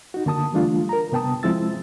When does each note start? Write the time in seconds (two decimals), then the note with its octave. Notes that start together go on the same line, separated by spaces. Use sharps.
0.14 D#4 F#4
0.26 D3 A#3 A5 D#6
0.53 E3 G3 A3 D4 F4
0.89 A#4 A#5
1.12 C3 B3 G5 A5 D#6
1.43 F3 G#3 C4 E4 E6 A6